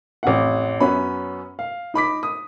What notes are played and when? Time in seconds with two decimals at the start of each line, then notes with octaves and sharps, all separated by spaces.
0.23 A1 F2 F#5
0.80 F#2 B3 C#4 B5
1.59 F5
1.94 D#4 B5 D6 B6
2.23 D#6